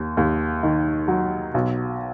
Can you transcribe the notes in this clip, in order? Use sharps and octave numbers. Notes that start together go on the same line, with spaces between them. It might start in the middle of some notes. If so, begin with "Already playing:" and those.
Already playing: D#2
D#2
D#3
F#3
B1